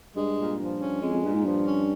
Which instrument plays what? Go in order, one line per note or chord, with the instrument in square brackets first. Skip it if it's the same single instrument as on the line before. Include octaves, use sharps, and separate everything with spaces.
[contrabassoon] G2 [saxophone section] G#3
[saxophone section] A#2
[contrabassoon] G2 [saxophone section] F3
[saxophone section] C#4
[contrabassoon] F2 [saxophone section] G#3
[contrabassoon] F2
[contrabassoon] G2 [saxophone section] A#2
[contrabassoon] G#2
[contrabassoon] G2 [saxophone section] F3
[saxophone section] C#4